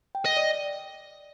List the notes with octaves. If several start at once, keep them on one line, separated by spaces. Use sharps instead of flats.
G5
D#5
D5